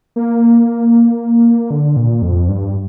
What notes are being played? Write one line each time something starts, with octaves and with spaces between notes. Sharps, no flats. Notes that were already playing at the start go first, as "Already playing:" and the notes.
A#3
D3
A#2
F2
G2